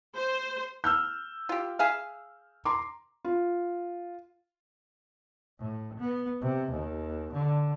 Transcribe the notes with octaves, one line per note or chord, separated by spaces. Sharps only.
C5
E6 F6 G6
F4 G4
G#4 E5 F5
A#5 C6 D6
F4
A2
B3
C3
D#2
D3